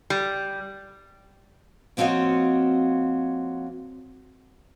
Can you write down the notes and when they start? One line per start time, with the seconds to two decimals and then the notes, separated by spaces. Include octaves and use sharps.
0.10 G3
1.97 F3 A#3 C4 F#4 C#5 D#5